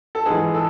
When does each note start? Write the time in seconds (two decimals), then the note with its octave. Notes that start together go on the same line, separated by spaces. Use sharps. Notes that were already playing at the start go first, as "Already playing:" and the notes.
0.15 A4
0.26 G#2 E3 G#4
0.54 A4